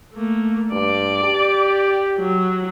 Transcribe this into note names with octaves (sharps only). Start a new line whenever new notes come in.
A3 A#3
G2 D5 D6
G4
F#3 F#4